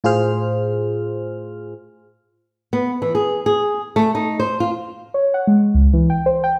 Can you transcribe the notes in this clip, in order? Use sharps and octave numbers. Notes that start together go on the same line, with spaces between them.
A2 F4 G#4 C5 F6
B3
E3
G#4
G#4
A3
D#4
C5
F4
C#5
F#5
G#3
C#2
E3
G5
C5
G5